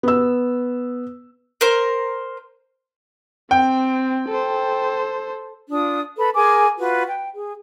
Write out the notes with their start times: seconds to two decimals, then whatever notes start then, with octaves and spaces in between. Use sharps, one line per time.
0.03 B3 E6
1.61 A#4 C5
3.51 C4 G5
4.28 A4 C5
5.70 D4 F4 D#6
6.18 A4 B4 B5
6.34 G#4 A#4 G#5 D6
6.78 F4 F#4 B4
7.07 G5
7.34 G#4